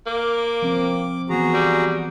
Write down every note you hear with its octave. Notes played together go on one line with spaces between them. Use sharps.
A#3 D6
F3 C4
E3 B3 F#4 G#4 A#5
G3